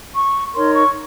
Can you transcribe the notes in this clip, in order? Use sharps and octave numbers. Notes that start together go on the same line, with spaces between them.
C#6
D#4 A#4 C#5 C6
C#6